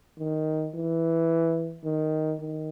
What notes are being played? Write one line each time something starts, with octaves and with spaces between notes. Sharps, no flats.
D#3
E3
D#3
D#3